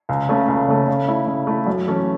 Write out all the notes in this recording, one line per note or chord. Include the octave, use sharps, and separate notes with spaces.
C#2
C#3 A3 C#4
C#2
C#3 A3 C#4
C#3
A3 E4
C#3
A3 E4
F#2
E3 A3 C#4